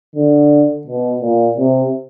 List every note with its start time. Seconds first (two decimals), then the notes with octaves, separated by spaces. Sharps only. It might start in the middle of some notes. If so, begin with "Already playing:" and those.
0.15 D3
0.87 B2
1.21 A#2
1.57 C3